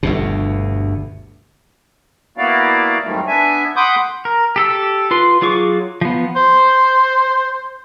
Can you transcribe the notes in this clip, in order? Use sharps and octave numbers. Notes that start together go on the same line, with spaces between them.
G1 D2 B2
A#3 B3 E4 F#4 D5 F5
F2 G#2 D#3 F#3 G3 A3
B3 D4 E5 G#5
F#5 B5 C6 D6 D#6 G6
A#4
G4 A4 E6
F4 B4 C6
F#3 F4 G#4 C#6 D6
F3 B3
C5